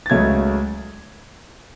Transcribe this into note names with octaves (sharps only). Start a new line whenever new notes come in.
A6
C#2 C#3 F#3 A3 G#6